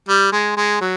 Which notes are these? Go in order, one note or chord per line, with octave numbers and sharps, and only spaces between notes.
G3
G#3
G#3
F#3